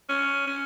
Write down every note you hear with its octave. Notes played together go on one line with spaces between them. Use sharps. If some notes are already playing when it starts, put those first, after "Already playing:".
C#4
C#4